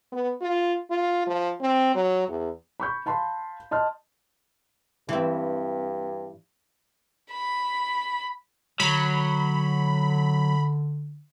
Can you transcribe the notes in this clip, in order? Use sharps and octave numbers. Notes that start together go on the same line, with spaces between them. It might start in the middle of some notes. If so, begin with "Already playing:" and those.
B3
F4
F4
F3
C4
F#3
E2
B5 C#6 G6
F5 A5 B5 C6
D#5 A5 C6 F6
G2 E3 C4
B5
D3 F#3 B5